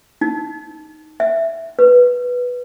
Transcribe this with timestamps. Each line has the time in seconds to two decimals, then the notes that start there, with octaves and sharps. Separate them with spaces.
0.21 D#4
1.20 E5
1.79 B4